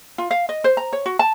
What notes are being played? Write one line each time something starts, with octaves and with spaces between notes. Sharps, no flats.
F4
F5
D#5
C5
A#5
C#5
F#4
A5